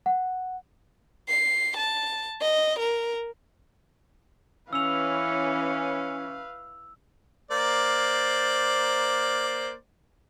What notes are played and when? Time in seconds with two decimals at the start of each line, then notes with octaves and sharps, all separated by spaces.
0.06 F#5
1.29 C7
1.76 A5
2.41 D#5
2.79 A#4
4.73 E3 C#4 B4 F5 E6 F7
7.51 A#3 C5 D5